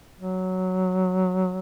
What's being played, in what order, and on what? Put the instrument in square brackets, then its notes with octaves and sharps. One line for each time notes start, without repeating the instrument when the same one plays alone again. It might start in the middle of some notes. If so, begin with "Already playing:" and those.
[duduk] F#3